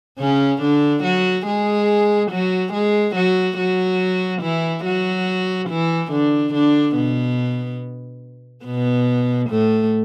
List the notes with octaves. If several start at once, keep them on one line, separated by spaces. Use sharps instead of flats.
C#3 C#4
D3 D4
F#3 F#4
G#3 G#4
F#3 F#4
G#3 G#4
F#3 F#4
F#3 F#4
E3 E4
F#3 F#4
E3 E4
D3 D4
D3 D4
B2 B3
B2 B3
A2 A3